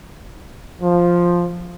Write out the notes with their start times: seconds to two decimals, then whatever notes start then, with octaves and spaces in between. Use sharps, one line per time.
0.82 F3